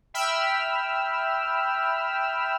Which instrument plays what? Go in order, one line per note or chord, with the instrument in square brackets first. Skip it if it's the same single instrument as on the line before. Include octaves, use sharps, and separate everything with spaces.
[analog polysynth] E5 G5 B5 E6 F6